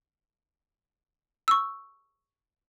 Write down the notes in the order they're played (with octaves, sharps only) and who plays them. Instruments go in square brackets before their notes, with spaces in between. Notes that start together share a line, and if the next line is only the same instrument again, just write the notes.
[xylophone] C#6 E6